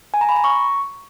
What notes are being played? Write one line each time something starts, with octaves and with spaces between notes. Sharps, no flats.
G#5
A#5
B5
A#5
C#6